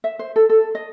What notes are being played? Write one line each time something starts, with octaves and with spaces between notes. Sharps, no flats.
E5
C5
A4
A4
D#5